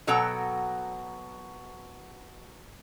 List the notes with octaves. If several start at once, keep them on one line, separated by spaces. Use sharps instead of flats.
B2 F#3 A4 F#5 G5 A#5